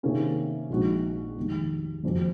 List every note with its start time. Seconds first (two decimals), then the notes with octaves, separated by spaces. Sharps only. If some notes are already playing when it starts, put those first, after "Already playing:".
0.03 C3 D#3 A#3 C#4 G#4
0.70 A#1 A#2 G#3 D#4 F#4
1.37 F1 D#2 D#3 G#3
2.03 F#1 F2 C#3 F#3